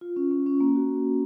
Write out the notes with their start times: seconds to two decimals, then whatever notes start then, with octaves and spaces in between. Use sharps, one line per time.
0.01 F4
0.16 C#4
0.31 C#4
0.46 C#4
0.61 A#3
0.76 F#4